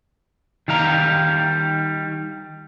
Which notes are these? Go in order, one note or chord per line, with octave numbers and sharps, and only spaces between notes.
D#3 G3 F5 A#5